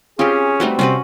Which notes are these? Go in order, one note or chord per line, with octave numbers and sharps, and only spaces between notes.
C4 C#4 F4 G4 G#4
G3 A3 C4 D#4 F#4 B4
C3 G3 C4 C#4 F#4 B4